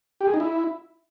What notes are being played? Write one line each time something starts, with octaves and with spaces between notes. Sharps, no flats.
G4
G#4
D#4
E4